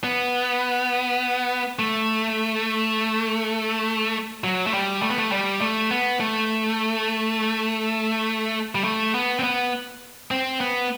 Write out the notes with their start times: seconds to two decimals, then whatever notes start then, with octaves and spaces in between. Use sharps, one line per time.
0.04 B3
1.79 A3
4.44 F#3
4.67 A3
4.74 G3
5.02 A3
5.10 B3
5.18 A3
5.32 G3
5.61 A3
5.91 B3
6.20 A3
8.75 G3
8.84 A3
9.14 B3
9.39 C4
9.43 B3
10.31 C4
10.61 B3